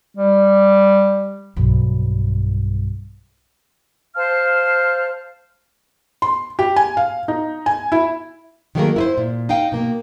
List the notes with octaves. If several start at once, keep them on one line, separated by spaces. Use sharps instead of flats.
G3
B1 G2
C5 F5 A5 F6
C6
G4
G#5
F5
D#4
G#5
E4
D#3 F#3 A3 A#3 G#4 A#4
E4 B4 C5
A#2
D#4 F5 G5
B2 A#3